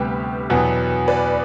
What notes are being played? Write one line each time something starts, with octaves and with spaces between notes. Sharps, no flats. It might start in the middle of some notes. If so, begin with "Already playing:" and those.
Already playing: D2 C3 G3 B3 G4 B4
E2 B2 F#3 B3
B4 D5